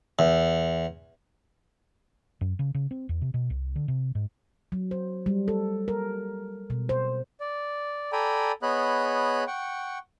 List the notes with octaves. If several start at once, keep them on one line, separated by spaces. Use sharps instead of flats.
E2
F#2
C#3
C#3
C4
E2
C3
B2
C2
D3
C3
G#2
F#3
C5
G3
A4
A#4
B2
C5
D5
A4 D5 G5 G#5 A#5 B5
B3 G#4 C#5 D#5 B5 F#6
F#5 G5 C#6